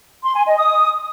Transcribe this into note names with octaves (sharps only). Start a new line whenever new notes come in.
C6
G#5
D#5
D#6